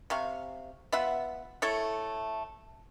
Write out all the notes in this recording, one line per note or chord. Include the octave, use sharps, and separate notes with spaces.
C3 F5 C#6
B3 F4 E5 F#5
A3 E4 A4 C#5